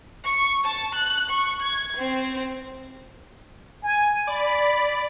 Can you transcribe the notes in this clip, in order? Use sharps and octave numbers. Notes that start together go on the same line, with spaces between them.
C#6
A5
F#6
C#6
G#6
C4
G#5
D5 B5